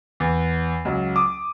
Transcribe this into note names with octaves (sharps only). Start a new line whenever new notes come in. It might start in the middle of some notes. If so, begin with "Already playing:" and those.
E2
C#2 F#3
D6 D#6